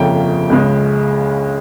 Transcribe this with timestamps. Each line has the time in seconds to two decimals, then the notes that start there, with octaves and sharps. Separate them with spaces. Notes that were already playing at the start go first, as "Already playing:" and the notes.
Already playing: G1 F2 C#3 F3 A#3 G5
0.50 C#2 C#3 G#3